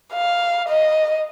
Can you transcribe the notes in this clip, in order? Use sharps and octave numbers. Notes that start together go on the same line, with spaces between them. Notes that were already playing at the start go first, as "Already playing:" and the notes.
F5
D#5